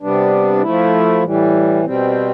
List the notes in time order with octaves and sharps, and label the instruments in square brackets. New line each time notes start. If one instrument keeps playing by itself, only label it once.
[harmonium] C3 G3 B3 D4
F3 A3 E4
A2 E3 G3
B2 G3 C4